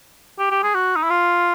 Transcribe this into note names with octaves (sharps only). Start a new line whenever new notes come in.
G4
G4
G#4
F#4
D#4
E4
F4